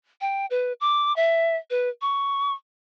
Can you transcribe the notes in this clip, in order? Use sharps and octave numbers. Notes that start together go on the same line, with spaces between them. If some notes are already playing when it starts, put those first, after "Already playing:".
G5
B4
D6
E5
B4
C#6